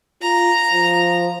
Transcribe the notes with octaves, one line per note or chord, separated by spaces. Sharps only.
F4 A#5
F3